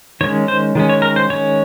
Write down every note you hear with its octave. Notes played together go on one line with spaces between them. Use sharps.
D#3 G#3 C#4 C#5
C5
D#3 G#3 C#4
C#5
A#4
C5
D#3 G#3 C#4 C#5